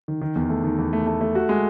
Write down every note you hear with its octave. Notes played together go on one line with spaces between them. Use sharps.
D#3
D#3
E2
A3
D#3
E2
A3
A3
A3
F#4
G#3